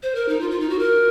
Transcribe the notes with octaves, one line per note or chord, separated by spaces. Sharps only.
C5
A#4
D#4
F4
F4
D#4
F#4
A#4